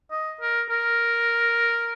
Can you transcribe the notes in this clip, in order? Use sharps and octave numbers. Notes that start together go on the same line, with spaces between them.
D#5
A#4
A#4